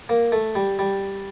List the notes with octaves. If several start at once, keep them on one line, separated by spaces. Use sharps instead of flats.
A#3
A3
G3
G3